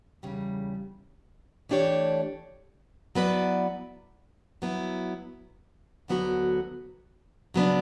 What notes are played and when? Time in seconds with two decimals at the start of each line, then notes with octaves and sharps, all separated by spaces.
0.23 E2 C#3 G3
1.69 E3 A3 D4 G4 C#5
3.15 F#3 B3 E4 B4 D5
4.62 F#3 B3 E4
6.08 D2 D3 F#3 B3 F#4
7.54 C#3 F#3 B3 D4